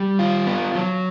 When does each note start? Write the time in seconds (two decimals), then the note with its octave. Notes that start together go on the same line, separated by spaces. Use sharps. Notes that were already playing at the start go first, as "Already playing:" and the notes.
Already playing: G3
0.19 F4
0.47 B3
0.75 F#3